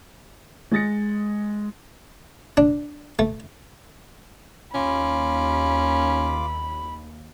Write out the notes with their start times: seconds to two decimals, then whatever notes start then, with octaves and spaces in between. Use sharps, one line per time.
0.72 G#3 D#6 A6 A#6 C#7
2.57 D4
3.19 A3
4.75 D#2 C#4 F4 B5 D6